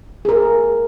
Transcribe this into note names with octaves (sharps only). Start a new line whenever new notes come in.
G#4 A#4